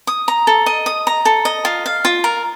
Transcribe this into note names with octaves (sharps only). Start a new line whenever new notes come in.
D#6
A#5
A4
D#5
D#6
A#5
A4
D#5
F4
F5
F4
A#4